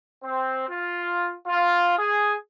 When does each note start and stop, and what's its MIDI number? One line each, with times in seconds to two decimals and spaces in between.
0.23 0.65 60
0.68 1.33 65
1.47 1.96 65
1.98 2.34 68